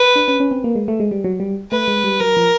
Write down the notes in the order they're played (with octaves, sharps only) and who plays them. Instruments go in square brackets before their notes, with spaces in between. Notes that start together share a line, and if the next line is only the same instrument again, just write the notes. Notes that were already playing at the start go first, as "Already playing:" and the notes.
Already playing: [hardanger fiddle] B4
[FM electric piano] D4
C#4
C#4
C4
A#3
G#3
A3
G#3
G3
F#3
G3
[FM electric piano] A3 [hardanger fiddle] B4
[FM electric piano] G#3
G3
[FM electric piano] F#3 [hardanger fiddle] A#4
[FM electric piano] F3